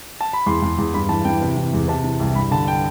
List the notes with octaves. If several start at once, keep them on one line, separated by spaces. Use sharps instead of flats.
A5
B5
E2 C6
E2
E2
G2 B5
E3 A5
E3 G5
C3
E3
E2
C3 A5
E3
C2
G2 B5
D3 A5
G5